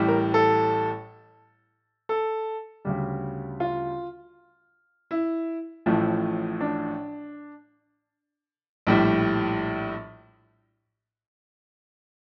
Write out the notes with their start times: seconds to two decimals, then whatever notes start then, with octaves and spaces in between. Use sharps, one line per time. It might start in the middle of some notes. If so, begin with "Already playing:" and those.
Already playing: A1 A2 G3
0.08 A#4
0.34 A4
2.09 A4
2.85 D2 C#3 G3
3.60 F4
5.11 E4
5.86 A1 A2 F3 A3
6.61 D4
8.87 A#1 A2 G3